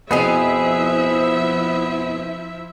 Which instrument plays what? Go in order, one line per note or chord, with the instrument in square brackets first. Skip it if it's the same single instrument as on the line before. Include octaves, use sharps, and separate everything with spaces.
[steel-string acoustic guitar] F2 B2 C4 [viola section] F3 E4 E5 [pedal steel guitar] B3 G#4